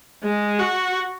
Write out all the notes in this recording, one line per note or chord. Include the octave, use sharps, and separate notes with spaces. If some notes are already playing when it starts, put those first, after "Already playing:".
G#3
F#4